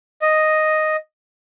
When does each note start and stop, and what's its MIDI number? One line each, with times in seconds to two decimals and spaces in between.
0.22 0.96 75